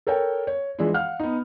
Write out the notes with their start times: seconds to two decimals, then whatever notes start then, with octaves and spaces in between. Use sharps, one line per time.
0.07 A4 A#4 C#5 G5
0.47 C#5
0.79 E3 F3 G#3 D4 E4
0.94 F5 F#5 F6
1.20 B3 D#4